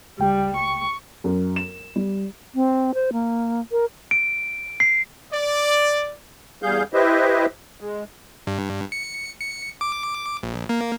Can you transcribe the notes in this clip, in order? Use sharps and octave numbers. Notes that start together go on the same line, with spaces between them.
C#2 G3 G5
C#6
F#2
E7
G3
C4
C5
A#3
A#4
D7
C7
D5
E2 G3 G#4 F5 G6
E4 G4 B4 C5 D#5 E5
G#3
G2
C#7
C#7
D6
A#1
A#3